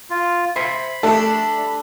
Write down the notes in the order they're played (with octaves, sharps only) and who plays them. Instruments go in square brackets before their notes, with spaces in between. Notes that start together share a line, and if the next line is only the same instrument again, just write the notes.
[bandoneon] F4
[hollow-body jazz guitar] C5 E5 G#5 [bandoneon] B5
[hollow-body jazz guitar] A3 G4 E5 [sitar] D4 [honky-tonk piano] A4